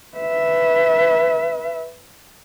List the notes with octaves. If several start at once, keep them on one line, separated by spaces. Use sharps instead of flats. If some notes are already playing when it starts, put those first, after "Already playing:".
B4 E5